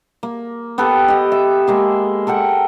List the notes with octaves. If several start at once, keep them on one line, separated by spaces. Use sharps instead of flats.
A#3
B3 G4 A4 B4
G4 D#5
E5
G#3 A#3 G#4
A4 A#4 F#5 G5